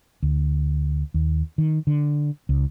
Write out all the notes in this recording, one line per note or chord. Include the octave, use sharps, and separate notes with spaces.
D2
D#2
D#3
D3
C#2